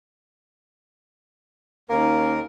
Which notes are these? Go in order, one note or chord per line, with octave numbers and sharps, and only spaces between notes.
D#2 A#3 C#4 D#4 A#4